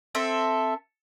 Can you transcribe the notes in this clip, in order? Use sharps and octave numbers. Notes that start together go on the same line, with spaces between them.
C4 A4 E5